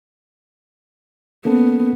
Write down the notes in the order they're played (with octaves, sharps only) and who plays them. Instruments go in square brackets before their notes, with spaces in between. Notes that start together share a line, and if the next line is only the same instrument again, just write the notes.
[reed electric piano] A#3 C#4 A4 [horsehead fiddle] B3